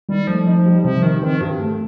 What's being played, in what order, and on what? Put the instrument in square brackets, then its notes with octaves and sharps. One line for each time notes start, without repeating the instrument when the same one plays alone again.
[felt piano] D#3 [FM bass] G3
[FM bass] F3 [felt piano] A3
[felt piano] D#4
G3
[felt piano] C3 [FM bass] F3
[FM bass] D#3 [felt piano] D#4
[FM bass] D#3 [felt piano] C4
[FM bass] G2 [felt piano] G4
[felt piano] A3